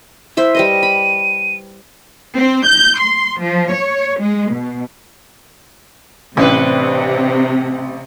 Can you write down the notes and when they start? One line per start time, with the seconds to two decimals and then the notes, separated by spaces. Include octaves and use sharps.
0.37 E4 C5 E5
0.55 G3 B4 D#5 D#7
0.83 B5
2.36 C4
2.67 G6
3.00 C6
3.40 F3
3.73 C#5
4.20 G#3
4.52 B2
6.37 A1 C3 C4 D4 B4